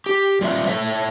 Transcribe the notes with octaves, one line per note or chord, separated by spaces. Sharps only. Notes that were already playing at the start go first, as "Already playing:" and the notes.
G4
G3 F4 B4 E5 F5
A4 A#4 C#5 E5